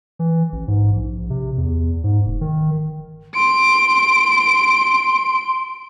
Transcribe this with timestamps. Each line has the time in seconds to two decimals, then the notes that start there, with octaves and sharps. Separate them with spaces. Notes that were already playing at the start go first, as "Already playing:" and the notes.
0.19 E3
0.52 A1
0.68 G#2
0.96 A#1
1.30 C3
1.57 E2
2.04 G#2
2.26 F1
2.41 D#3
3.35 C6 D7